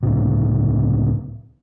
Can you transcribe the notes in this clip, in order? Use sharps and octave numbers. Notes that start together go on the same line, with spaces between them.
C#2 A2 C3